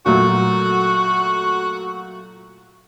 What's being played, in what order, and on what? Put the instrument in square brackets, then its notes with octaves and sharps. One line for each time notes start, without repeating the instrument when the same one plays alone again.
[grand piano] A#2 F#3 A3 [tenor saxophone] F#4